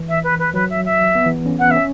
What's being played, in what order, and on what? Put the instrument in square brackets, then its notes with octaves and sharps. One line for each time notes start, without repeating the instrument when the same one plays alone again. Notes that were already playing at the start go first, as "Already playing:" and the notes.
Already playing: [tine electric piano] E3
[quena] E5
B4
B4
[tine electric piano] F#3 [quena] B4
[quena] E5
E5
[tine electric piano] B3
E3
C#4
[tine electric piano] B3 [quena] F#5
[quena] E5
[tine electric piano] C#4